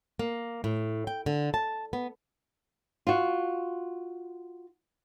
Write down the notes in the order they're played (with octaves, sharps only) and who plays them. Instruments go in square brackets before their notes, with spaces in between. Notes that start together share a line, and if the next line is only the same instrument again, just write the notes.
[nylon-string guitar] A#3
A2
G5
D3
A5
B3
F4 F#4